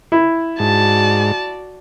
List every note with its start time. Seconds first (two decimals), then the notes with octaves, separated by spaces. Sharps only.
0.12 E4
0.60 G#2 F#4 D5 A5